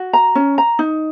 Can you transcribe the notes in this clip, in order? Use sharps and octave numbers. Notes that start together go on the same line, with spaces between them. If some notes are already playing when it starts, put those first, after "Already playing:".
Already playing: F#4
A#5
C#4
A#5
D#4